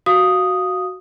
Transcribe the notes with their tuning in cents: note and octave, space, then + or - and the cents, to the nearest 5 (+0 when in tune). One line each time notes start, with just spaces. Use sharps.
F#4 +0 F5 +0 D#6 +0